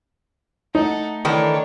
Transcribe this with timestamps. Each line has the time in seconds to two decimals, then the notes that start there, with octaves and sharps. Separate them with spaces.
0.75 A3 D#4 A4 F#5
1.25 D#3 E3 D4 A4 C#5